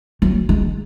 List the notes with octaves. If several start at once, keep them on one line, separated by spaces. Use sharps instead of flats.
F#3
G#3